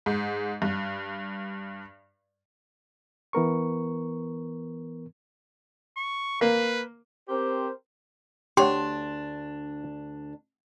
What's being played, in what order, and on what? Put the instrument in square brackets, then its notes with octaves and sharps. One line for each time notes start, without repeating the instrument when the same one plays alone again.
[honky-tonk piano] G#2
G2
[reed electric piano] E3 B3 A#4 C#6
[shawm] C#6
[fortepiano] A#3 [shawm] B4
[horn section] C4 G4 A#4 C5
[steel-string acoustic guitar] D2 D4 [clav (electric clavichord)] G4 C#5 F#5 [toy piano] C6